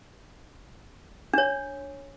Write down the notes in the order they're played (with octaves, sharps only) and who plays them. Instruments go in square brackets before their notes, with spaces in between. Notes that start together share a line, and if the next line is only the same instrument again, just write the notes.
[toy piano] D4 C#5